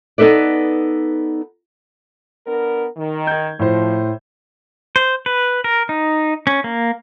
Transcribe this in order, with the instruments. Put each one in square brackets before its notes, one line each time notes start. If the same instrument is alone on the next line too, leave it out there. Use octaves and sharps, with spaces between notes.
[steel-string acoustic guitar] B3 D#4 A4 B4 D5
[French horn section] B3 D4 A#4
D#3
[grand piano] G6 G#6
[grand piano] A2 C5 [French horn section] F3
[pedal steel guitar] C5
B4
A#4
D#4
C#4
A#3